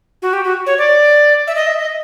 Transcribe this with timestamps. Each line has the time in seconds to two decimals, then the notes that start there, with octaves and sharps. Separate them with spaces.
0.22 F#4
0.33 G4
0.45 F#4
0.66 C#5
0.78 D5
1.47 E5
1.55 D#5
1.67 E5
1.79 D#5